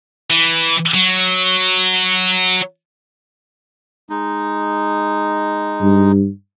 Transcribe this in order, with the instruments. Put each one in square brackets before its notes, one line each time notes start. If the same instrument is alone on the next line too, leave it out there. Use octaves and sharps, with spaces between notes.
[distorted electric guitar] E3
F#3
[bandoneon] G#3 D#4
[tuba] G2